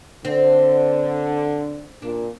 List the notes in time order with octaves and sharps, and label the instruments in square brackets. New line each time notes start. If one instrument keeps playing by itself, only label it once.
[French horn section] D3 [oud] C4
[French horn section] A#2 [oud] D4